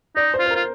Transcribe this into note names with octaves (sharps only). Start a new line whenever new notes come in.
D#4 D5
C5
F4
C5
A#4
F4